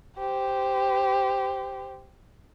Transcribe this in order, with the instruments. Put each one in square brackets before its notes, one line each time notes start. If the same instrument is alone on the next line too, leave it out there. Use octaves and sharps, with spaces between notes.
[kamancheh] G4 C5